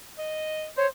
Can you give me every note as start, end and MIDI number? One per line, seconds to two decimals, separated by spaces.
0.18 0.67 75
0.77 0.87 72
0.77 0.86 73